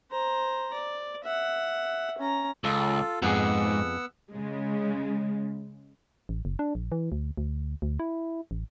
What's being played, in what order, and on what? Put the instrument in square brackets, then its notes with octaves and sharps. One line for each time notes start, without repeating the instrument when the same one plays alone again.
[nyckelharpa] C5 A#5
D5
E5 F#5
C#4 A#5
[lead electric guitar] C#2 [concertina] F4 A4
[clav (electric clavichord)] F2 G#4 [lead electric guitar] G#2 [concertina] B3 F#5 E6
[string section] C#3 G#3
[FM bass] A1
F#1
D4
A#1
E3
D2
D2
D2
E4
A1